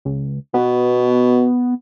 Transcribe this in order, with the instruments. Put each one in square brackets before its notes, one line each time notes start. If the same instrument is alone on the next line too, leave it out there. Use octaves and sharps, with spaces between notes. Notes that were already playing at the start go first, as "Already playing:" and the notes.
[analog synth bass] C#2
[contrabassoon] B2 [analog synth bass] B3